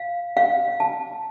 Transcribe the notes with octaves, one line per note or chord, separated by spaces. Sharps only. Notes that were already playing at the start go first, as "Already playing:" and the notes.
Already playing: F5
F5
A5